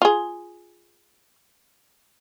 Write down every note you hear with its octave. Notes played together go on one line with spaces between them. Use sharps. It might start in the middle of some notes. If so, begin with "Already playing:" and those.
F4 G#4